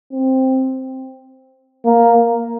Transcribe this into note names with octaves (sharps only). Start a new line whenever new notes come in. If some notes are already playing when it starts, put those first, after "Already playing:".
C4
A#3